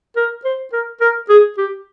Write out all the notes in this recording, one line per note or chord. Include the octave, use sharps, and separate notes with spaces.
A#4
C5
A#4
A#4
G#4
G4